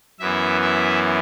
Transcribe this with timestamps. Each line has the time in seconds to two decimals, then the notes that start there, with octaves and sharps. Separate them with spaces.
0.19 F#2 E3 B3 E5
0.61 E5